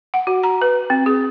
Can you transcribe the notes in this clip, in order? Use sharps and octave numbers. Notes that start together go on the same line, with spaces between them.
F#5
F#4
A#5
B4
C4
G#4